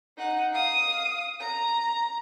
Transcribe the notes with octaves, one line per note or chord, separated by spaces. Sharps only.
D#4 F#5
F5 D#6
A#5